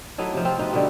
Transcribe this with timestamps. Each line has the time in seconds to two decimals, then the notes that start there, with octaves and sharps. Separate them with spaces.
0.18 F#3 A3 D#4 E4
0.33 C3 F3
0.45 C4 F4
0.59 B2 D#4 F4 B4
0.73 B2 D3 G3